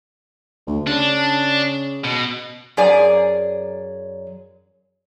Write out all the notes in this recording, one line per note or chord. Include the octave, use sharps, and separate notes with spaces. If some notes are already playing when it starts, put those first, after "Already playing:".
D2
C#3 D4
B2
F#2 G#4 D5 G#5